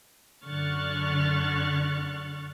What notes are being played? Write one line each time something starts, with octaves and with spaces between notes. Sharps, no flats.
F#2 D3 C#6 F6 F#6 A6